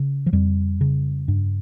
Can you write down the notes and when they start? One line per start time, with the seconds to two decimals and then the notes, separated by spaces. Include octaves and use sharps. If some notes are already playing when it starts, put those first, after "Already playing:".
Already playing: C#3
0.26 F3
0.33 F2 G3
0.81 C#3
1.28 G2